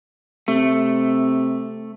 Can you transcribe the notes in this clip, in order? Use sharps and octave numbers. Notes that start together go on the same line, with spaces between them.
C3 A3